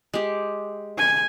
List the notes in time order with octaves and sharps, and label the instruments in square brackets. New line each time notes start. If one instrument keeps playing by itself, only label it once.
[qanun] G#3 G4
[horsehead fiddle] G#5